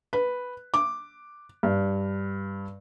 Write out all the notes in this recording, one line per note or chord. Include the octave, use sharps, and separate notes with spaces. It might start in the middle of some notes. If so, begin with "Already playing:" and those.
B4
D6
G2